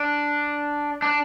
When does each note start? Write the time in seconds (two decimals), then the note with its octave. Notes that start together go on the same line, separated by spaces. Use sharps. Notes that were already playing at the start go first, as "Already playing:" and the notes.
Already playing: D4
1.02 D4